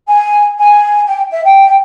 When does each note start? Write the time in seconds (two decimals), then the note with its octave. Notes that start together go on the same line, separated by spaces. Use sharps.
0.08 G#5
0.59 G#5
1.06 G5
1.31 E5
1.44 G5